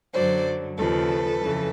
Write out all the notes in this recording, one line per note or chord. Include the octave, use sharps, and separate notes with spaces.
F#2 D3 F#3 C5 D5
D#2 C#3 F3 A4 B4
F2 C#3 E3